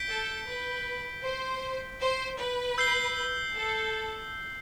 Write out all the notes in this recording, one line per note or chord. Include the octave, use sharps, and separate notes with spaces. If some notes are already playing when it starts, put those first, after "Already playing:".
Already playing: G6 B6 D7 G7
A4
B4
C5
C5
B4
E6 G6 C7 G7
A4